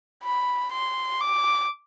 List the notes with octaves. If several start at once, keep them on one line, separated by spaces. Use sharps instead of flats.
B5
C6
D6